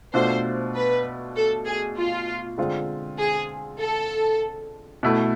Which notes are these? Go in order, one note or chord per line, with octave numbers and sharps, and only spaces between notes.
B2 A3 D4 F4 C5
B4
A4
G#4
F4
D3 G#3 C4 F4
G#4
A4
B2 A3 E4